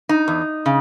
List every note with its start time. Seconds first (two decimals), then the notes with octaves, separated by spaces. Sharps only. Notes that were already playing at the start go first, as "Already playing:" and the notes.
0.09 D#4
0.28 E2
0.66 C#3